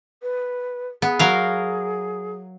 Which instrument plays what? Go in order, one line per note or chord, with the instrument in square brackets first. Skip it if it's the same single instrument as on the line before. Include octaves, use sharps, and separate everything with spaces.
[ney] B4
[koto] B3 [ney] G#4
[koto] F#3 A#4 F5